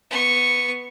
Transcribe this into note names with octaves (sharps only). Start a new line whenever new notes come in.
B3 C#6